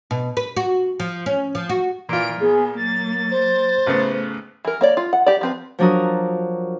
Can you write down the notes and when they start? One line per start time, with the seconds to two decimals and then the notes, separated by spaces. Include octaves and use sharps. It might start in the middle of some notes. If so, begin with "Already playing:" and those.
0.11 B2
0.37 B4
0.56 F#4
1.00 F3
1.26 C#4
1.55 F3
1.69 F#4
2.09 A#2 E3 F4 D7
2.40 B3 G#4
2.76 F#3 A#3 A6
3.31 C5
3.87 A1 C#3 A3 B3
4.65 E3 A#4
4.81 A#3 C#5 D5
4.97 F4
5.13 F#5
5.26 G4 D5
5.41 F3 C4 B4
5.79 F3 F#3 D4 F#4 A#4 D#6